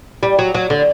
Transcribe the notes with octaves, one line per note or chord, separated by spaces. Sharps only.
G3
F#3
F#3
D3